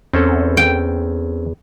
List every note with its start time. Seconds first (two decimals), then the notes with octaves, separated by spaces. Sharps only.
0.14 E2 C4 C#4 A4
0.57 G5